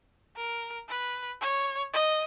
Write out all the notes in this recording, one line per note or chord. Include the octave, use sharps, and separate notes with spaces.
A#4
B4
C#5
D#5